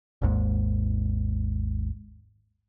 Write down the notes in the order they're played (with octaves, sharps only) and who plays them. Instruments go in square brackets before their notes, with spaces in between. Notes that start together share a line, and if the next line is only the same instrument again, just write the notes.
[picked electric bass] G#1 D#2 G#2